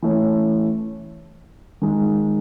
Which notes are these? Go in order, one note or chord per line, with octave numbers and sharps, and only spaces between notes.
E3 A3 C#4
D#3 G#3 D#4